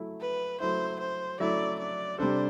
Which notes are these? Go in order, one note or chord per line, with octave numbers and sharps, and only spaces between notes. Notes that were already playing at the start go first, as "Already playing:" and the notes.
Already playing: F#3 A3 E4
B4
F#3 A3 E4 C5
C5
F#3 A3 E4 D5
D5
C3 G3 D4 A4 C5